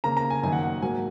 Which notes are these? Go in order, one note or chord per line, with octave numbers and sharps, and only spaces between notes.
C#3 A#3 A#5
A#5
G#5
F#2 D#3 A#3 G#5
F#5
F#5
G#2 F#3 A#3 G#5